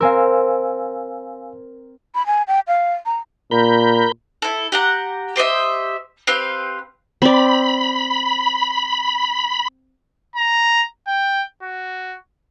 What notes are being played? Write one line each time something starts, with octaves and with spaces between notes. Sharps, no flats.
C4 A#4 F5 G#5 E6
B5
G#5
G5
F5
A#5
A#2 A#4 B5 G6
E4 A4
G4 F#5 A#5
G4 C5 D#5 E5
C4 G4 B4 F5
C4 D5 B5
A#5
G5
F#4